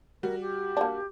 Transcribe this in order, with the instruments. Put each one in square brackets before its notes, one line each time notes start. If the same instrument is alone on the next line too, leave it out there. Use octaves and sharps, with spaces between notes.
[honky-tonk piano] G3 F#4 [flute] A#4
[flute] G4
[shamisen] A#3 D4